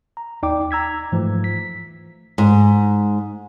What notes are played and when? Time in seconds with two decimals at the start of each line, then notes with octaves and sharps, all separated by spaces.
0.17 A#5
0.43 D#2 D#4 D5 G5 D6
0.71 A#5 E6 G#6 B6
1.12 G#2 E3 F3 A3
1.44 B6
2.38 G#2